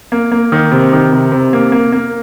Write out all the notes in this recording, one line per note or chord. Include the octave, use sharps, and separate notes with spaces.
A#3
A#3
D#3
C3
D#3
C3
C3
A#3
A#3
A#3